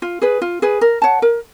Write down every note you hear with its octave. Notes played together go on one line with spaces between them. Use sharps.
F4
G#4 B4
F4
G#4 B4
A#4
C#5 F#5 A5
A#4